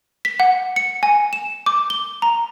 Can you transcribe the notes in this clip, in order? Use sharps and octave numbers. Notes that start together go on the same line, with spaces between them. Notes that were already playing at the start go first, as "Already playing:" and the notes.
B6
F#5
C#7
G#5
E7
D6
G7
A#5